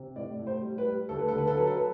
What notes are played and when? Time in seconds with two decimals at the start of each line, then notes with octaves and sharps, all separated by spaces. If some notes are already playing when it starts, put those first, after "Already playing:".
Already playing: C3
0.16 A2 D5
0.39 A2
0.47 C5
0.62 G3
0.78 B4
0.86 G3
1.09 D2 A4
1.19 B4
1.28 A4
1.33 D3 B4
1.47 A4
1.56 F#3 B4
1.67 A4
1.76 B4